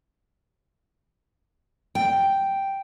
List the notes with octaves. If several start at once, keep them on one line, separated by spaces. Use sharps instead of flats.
G5